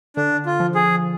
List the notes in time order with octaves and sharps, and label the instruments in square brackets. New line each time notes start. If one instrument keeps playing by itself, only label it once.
[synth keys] D3 [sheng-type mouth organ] D4
[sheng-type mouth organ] F4
[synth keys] F3
[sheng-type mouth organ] G#4